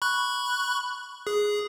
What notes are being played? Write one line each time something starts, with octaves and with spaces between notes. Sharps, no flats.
B5 C#6 F#6
G#4